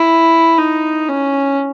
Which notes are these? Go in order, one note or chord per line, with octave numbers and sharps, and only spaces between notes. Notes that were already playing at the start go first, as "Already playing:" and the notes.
Already playing: E4
D#4
C#4